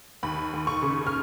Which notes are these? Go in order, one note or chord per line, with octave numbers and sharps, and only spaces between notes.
D#2 B5
D#2
C#6
C#3
F6